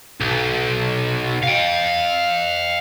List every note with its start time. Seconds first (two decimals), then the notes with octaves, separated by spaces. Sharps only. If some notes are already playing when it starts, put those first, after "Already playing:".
0.21 B1
1.43 F5 G5